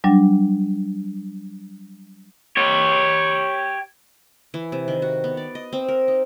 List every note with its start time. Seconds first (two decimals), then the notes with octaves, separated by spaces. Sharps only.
0.04 F#3 G3 D4
2.57 G4 C#5
4.54 E3
4.72 C3
4.88 D#3
5.02 F#4
5.24 B3
5.37 D5
5.55 D#5
5.73 C4
5.89 A#4
6.08 D#4